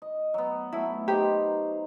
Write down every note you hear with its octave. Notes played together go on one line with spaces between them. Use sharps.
D#5
F#3 B3
F#3 A3 E4
D#4 G4 C5 A#5